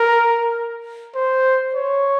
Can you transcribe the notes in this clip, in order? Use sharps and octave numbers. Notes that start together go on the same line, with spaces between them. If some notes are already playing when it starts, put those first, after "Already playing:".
Already playing: A#4
C5
C#5